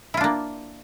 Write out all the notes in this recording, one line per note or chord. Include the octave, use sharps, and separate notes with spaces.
A#3 D4 E4 F4